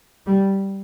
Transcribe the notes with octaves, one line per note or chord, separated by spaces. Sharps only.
G3